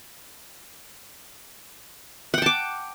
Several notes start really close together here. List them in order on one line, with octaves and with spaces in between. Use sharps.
F#5 G5 A5 D6